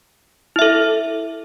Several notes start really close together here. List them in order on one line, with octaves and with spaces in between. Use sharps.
E4 E5 A4